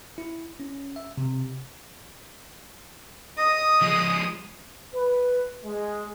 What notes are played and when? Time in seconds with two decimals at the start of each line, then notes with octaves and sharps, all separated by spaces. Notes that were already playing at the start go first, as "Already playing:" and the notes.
0.18 E4
0.60 C#4
0.96 E5
1.18 C3
3.38 D#5 D#6
3.81 F3 G#3
4.94 B4
5.65 G#3